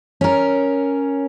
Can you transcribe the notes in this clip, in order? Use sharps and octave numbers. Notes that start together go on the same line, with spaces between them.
C#4 A#4